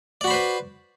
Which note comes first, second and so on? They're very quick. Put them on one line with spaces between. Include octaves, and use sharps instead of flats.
D5 F#4 B5 C5 B4